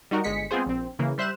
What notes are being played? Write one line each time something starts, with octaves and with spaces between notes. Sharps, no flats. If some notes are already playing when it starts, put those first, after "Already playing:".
G3 D#4 F#4 A#4
G1 G#3 B6 C#7
G#3 B3 C4 F4 G#4 C5
A#1 C4
C#3 E3 A#3
G3 C5 E5 F#6 E7